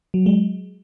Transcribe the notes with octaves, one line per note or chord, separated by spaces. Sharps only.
F#3
G#3